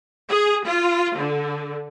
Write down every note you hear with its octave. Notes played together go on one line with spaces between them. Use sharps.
G#4
F4
D3